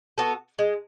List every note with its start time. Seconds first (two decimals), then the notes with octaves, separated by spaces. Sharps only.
0.18 B3 F#4 A4
0.59 G#3